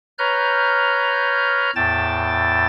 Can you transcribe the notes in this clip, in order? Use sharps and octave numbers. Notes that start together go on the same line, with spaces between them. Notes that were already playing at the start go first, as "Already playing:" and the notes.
B4 C#5 A#5 F6 G6
E2 A2 G5 A5 A6